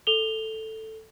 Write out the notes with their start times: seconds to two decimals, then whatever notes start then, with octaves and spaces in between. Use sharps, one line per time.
0.07 A4 F7 G7